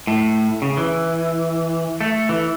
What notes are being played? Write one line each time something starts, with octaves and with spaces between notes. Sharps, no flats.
A2
C#3
E3
A3
E3